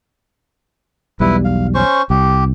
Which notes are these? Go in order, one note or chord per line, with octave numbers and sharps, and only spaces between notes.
B1 E2 G3 E4 B4
F5
C#4 C5 C#6
C2 G4